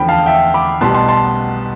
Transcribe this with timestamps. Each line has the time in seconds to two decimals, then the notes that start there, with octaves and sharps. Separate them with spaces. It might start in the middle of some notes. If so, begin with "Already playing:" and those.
Already playing: E2 D3 F3 G5 B5
0.09 F5 A5
0.26 E5 G5
0.54 B5 D6
0.81 B1 B2 G3 B3 A5 C6
0.94 A5 C6
1.09 A5 C6